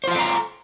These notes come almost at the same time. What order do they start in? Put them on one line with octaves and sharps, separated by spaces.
C5 F4 F5 A4 A#5